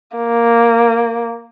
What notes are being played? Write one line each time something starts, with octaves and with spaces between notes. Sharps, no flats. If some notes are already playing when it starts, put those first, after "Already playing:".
A#3